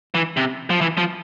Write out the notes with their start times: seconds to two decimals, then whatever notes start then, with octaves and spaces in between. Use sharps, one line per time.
0.15 E3
0.37 C3
0.70 F3
0.81 E3
0.97 F3